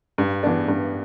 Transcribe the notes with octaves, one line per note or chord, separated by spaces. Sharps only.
G2
E3 B3 D4
G2